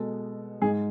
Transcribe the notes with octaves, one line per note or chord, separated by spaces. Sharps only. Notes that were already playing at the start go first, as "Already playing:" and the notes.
Already playing: B2 G#3 A4
G#2 G#3 G#4